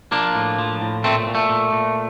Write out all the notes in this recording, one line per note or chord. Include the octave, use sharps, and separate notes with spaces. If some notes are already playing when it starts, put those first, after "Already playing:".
F3 A#3 D4
A2
F3
A2
A#2 A3 C4
A#2
A3
A#2
A#2